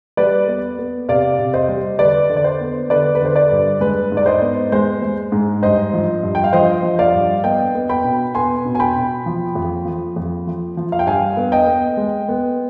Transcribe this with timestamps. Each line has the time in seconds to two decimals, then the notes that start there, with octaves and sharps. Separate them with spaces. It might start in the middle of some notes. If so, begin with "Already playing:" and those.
0.17 G3 B4 D5
0.48 B3
0.79 B3
1.09 C3 D5 F5
1.39 C3
1.54 C5 D#5
1.69 G3
1.99 D3 B4 D5
2.29 D3
2.36 D5
2.44 C5
2.61 B3
2.90 D3 B4 D5
3.15 B4
3.21 D3 C5
3.35 B4 D5
3.51 G2
3.80 G#3 B4
4.12 G#2
4.17 D5
4.26 C5 D#5
4.41 B3
4.72 G#3 C5
5.02 G#3
5.32 G#2
5.62 G2 C5 D#5
5.93 F3
6.23 G2
6.35 G5
6.44 F5
6.53 F3 C5 D#5
6.83 F3
6.99 D5 F5
7.14 G2
7.44 B3 D#5 G5
7.75 B3
7.89 G5 B5
8.04 B2
8.35 B3 G#5 C6
8.65 B2
8.75 G#5
8.80 G5 B5
8.96 B2
9.26 F3
9.55 F2
9.85 F3
10.16 F2
10.47 F3
10.77 F3
10.92 F5
10.99 G5
11.07 G2 F5 G#5
11.37 B3
11.52 D#5 G5
11.67 B3
11.97 G#3
12.29 B3